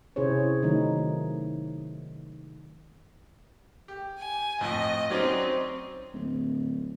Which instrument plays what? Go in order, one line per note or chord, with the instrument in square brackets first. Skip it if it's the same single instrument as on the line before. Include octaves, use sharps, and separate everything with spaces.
[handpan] C3 C#4 E4 G#4 C5 C#5
D#3 F#3 A3 D#4
[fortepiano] G4
[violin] G#5
[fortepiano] F2 A2 [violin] D#5
[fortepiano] F#3 C#4 D5 [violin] C4 D#4
[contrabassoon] D1